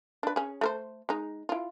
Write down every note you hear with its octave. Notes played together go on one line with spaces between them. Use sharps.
D4 B4
C#4 G#4
A3 A#4 C5
G#3 D#4
E4 F4